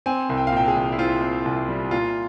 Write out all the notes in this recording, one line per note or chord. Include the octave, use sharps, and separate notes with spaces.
C4 G#5
C2
G5
F5
A#2 G5
G#4
C2
E4
C4 F4
C4
C2
G3
A#2 F4